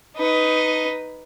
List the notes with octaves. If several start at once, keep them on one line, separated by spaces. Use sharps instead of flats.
D#4 B4